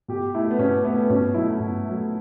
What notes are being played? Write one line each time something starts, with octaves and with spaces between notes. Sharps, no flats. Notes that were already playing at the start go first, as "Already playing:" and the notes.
B2 G4
A3 E4
B3
B2 C#4
A3 B3
B2 C#4
F#3 A3 E4
B2
A3
F#3